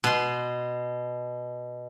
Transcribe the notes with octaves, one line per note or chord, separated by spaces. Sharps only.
B2 C6